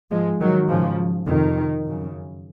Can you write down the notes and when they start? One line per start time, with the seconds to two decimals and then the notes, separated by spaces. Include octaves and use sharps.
0.11 G#2 F3 G#3
0.41 D#3 F#3
0.69 G#2 C#3 F3
1.27 F2 C3 D#3
1.86 F#2 C#3